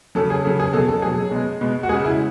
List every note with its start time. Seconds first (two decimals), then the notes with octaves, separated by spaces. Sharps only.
0.15 C#3 F#3 A4
0.30 G#4
0.45 C#3 F#3 A4
0.60 G#4
0.73 B2 A4
0.79 F#3
0.88 A4
1.02 B2 F#3 G#4
1.31 B2 G#3
1.61 B2 G#3
1.83 F#4
1.89 C#3 G#3 G#4
2.05 E4